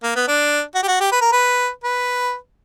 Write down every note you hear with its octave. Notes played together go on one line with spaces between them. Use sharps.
A#3
B3
D4
F#4
G4
F#4
G4
B4
A#4
B4
B4